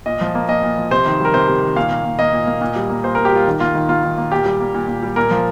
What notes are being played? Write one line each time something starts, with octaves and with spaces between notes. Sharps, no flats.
A#2 D#5
F3
A#3
A#2 D#5
A#2
F3
C3 C5
D#3
G3
A#4
C3 C5
C3
D#3
A#2 F5
A#3
A#2
A#3 D#5
A#2
A#3
A#2
G3
A#3
A#2 C5
A#2 A#4
G4
G3 F4
D#3
A#3 F4
D#3
A#3 F4
D#3
A#3
A#2 G4
G3
A#3
A#2
A#2
G3
A#2 A#4
F3